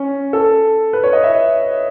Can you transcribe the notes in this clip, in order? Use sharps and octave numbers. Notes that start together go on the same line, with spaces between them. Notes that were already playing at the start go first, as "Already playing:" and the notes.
Already playing: C#4
A4
B4
C#5
D#5
E5